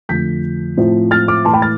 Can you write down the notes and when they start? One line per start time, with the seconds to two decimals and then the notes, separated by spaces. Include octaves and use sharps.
0.09 F2 D3 F3 A3 G6 B6
0.77 A2 F3 C4 F4
1.11 F6 A6
1.28 D6 F6
1.45 A2 E3 A3 A5 C6
1.53 G5 B5
1.62 F6 A6